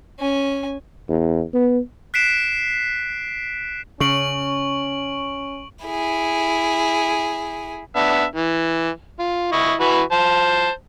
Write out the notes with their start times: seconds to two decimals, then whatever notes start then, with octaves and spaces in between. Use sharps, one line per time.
0.19 C#4 G#5
1.09 E2
1.54 B3
2.14 F#6 B6 C7 D7 E7
4.00 C#3 C#4 C#6 D7 F#7
5.85 E4 G#4
7.96 B3 D4 E5
8.35 E3
9.19 F4
9.52 E4 D#5 C#6
9.80 E3 F#4 B4
10.12 C5 A5